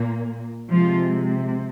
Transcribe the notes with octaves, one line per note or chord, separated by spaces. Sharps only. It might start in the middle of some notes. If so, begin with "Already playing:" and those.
Already playing: A#2 A#3
C3 F3 G#3 F4